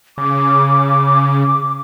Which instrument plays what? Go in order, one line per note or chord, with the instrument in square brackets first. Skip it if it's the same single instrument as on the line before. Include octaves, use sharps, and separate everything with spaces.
[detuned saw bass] C#3 [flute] D6